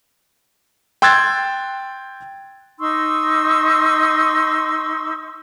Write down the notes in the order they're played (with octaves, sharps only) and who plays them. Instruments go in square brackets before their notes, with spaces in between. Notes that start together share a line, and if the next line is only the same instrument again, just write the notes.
[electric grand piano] G5 C6 E6 F#6 G#6 A6
[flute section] D#4 C6 C#6 E6